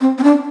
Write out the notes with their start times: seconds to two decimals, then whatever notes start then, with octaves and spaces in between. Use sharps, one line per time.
0.01 C4
0.18 C4
0.24 D4